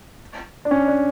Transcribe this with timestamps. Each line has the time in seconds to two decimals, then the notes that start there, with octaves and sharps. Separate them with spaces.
0.65 D4
0.71 C#4
0.88 D4